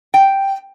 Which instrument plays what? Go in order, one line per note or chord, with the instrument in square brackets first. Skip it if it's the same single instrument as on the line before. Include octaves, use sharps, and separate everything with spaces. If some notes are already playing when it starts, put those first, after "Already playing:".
[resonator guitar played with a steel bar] G5